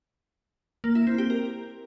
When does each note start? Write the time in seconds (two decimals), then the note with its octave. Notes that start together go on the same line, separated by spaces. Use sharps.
0.84 A#3
0.95 E4
1.07 C4
1.18 G4
1.30 A#4